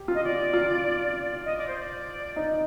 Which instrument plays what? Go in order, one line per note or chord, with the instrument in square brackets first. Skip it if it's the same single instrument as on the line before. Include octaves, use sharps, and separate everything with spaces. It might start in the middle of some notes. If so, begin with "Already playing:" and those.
Already playing: [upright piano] G4
F4
[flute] D#5
D5
[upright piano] F4
[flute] D#5
D5
C5
D5
[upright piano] D#4